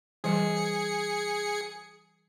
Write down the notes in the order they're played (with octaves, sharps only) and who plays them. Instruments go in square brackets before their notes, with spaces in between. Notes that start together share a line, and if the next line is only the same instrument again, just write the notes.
[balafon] E3 G3 B4 [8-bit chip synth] G#4 C#7